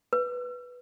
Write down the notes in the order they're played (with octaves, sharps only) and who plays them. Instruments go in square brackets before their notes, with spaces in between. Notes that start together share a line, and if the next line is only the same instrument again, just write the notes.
[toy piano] B4